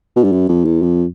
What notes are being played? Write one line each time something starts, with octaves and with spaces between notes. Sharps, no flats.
B2
G2
F#2
F2
E2
F2